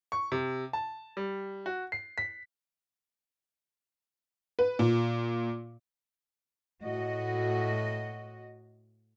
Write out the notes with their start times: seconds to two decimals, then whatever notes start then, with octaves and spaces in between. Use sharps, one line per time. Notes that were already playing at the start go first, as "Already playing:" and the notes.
0.12 C#6
0.32 C3
0.73 A5
1.17 G3
1.66 F#4
1.92 C7
2.18 B6
4.59 B4
4.79 A#2
6.83 A2 F#4 D#5